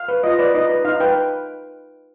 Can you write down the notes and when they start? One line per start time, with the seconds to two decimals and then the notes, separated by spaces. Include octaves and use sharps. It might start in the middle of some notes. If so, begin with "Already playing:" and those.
Already playing: F5
0.08 B4
0.23 F4 D#5
0.39 B4 D5
0.54 D#4 D#5
0.69 B4
0.85 D#4 F5
1.00 B4 G5